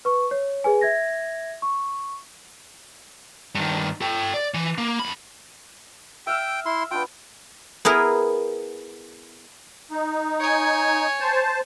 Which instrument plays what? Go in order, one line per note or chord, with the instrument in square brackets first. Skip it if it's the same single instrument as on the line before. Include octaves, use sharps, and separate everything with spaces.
[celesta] B4 C#6
C#5
G#4 B4 G#5
E5 G#6 A#6
C#6
[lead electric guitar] G2 D#3
A4 G5
D5
E3
A#3
F#2 B5
[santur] E5 F5 E6 [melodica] G5
[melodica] E4 C6
[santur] B3 D4 F4 [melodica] G5
[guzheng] B3 E4 G#4 A#4
[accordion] D#4
[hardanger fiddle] C#5 G#5
[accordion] C5 A5